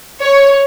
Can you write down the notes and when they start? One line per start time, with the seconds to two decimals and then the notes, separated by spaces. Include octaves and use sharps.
0.21 C#5